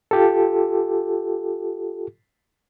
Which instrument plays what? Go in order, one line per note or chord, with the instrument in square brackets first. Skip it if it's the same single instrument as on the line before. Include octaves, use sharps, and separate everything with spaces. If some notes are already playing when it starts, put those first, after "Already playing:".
[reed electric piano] F4 G4 A4